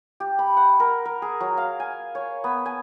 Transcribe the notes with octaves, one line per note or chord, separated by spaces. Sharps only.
G4
B5
F#5
A#4
A#4
G#4
F#3
F5
G#5
C#5
B3
G#5